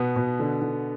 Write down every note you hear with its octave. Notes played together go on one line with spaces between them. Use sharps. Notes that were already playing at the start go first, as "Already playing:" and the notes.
Already playing: B2 B3
B2
D3
D3